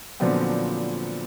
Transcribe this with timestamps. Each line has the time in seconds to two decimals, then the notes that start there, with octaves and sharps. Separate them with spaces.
0.20 A#2 D3 F3 F#3 B3 C4